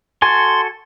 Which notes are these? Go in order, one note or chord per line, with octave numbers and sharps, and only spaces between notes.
F#4 A4 G#5 C6